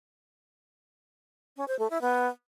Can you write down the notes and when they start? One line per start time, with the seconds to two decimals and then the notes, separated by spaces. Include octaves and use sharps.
1.57 C#4
1.68 C5
1.79 A3
1.90 E4
2.01 B3